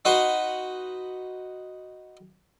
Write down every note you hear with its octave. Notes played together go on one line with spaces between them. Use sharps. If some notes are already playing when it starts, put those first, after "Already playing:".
D#4 F#4 B4 F#5 B5 C6